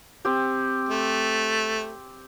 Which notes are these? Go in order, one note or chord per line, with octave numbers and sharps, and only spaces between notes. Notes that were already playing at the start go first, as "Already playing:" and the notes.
C4 G4
A3